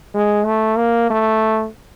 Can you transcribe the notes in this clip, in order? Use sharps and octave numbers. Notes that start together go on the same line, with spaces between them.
G#3
A3
A#3
A3